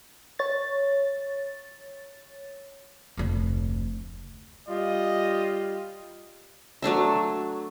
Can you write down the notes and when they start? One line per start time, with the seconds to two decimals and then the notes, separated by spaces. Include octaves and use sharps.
0.39 C#5 A6
3.17 F1 D2
4.68 G3 F4 D#5
6.82 F#3 A3 D4 E5